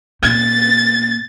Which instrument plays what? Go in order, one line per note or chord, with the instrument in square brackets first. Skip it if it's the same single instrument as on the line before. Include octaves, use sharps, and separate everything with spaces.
[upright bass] A#2 [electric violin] A6